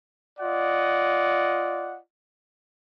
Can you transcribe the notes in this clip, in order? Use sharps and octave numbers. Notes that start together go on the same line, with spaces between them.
F4 D5 D#5 F#5